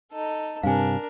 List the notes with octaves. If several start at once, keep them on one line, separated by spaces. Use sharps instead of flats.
D#4 A4
G2 C3 D4 A#4 F5 G#5